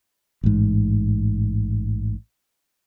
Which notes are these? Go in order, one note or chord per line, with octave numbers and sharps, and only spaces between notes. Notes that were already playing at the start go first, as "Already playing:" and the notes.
A1 G#2